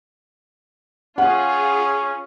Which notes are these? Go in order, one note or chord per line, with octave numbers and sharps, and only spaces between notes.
C#4 F4 G#4 F#5